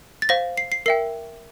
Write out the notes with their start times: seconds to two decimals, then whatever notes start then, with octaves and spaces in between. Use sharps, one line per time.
0.22 A6
0.29 C5 F5 A#6
0.57 C7
0.72 C7
0.86 A#4 E5 G5 C7